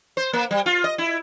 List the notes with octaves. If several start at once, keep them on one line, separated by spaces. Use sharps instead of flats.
C5
A#3
G3
F4
D#5
E4